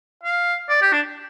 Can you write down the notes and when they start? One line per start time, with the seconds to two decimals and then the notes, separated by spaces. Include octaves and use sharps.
0.24 F5
0.69 D5
0.82 G4
0.92 D4